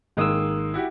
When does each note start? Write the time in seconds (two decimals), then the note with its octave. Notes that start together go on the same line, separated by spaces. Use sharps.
0.17 G#1 D#3 G#3 A#3 D#6 E6
0.74 E4 F#4 G4